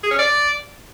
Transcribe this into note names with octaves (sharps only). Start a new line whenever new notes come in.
G#4
C#4
D5